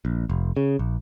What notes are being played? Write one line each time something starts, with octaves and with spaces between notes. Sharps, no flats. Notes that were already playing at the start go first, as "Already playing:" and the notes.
A#1
F1
C#3
A#1